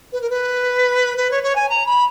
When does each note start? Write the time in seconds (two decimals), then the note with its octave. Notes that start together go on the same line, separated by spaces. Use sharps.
0.12 B4
0.21 A#4
0.29 B4
1.17 B4
1.30 C#5
1.42 C#5
1.55 G#5
1.69 A#5
1.85 B5